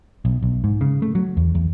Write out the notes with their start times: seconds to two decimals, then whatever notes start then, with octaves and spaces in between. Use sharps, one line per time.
0.25 B1
0.43 B1
0.64 G#2
0.81 C#3
1.02 A3
1.15 F#3
1.37 E2
1.55 E2